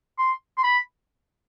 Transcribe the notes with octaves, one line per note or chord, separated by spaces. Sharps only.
C6
C6
B5